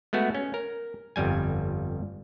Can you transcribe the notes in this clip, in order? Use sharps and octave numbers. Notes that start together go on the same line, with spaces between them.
G#3 A3 B3 F#4
C#4
A#4
G1 F2 G3 G#5